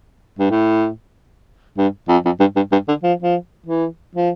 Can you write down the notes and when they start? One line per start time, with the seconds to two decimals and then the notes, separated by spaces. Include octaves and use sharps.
0.39 G2
0.50 A2
1.77 G2
2.08 F2
2.25 F2
2.40 G2
2.56 G2
2.72 G2
2.88 D3
3.03 F3
3.22 F3
3.66 E3
4.15 F3